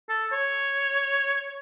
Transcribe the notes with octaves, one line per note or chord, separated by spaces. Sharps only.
A4
C#5